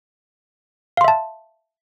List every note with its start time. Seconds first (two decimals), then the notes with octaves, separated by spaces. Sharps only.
0.97 F5
1.01 C6
1.04 E5
1.08 A5